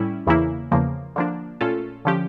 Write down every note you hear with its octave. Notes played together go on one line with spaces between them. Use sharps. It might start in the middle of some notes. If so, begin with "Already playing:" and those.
Already playing: A2 G3 C#4 E4
E2 C#3 E3 A#3 E4
E2 C#3 F3 A#3
D3 F3 A#3 D4
A#2 A3 C#4 F4 A4
D3 F3 C#4 G4